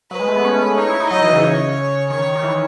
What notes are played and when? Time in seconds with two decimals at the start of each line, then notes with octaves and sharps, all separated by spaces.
0.11 F#3 B4
0.19 G#3
0.28 A3
0.36 B3
0.44 C#4
0.78 D#4 C#5
0.89 E4
1.00 D#4
1.11 F#3 D#5
1.22 E3
1.33 C#3
1.43 C#5
2.10 D#3 C#5
2.35 D#3
2.43 E3